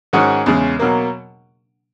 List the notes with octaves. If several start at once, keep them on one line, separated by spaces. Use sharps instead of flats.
G#2 D#3 G#3 C#4 F#4
E2 C#3 G#3 C#4
B2 F#3 A#3